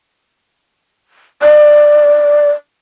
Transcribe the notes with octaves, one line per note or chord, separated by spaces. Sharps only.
D5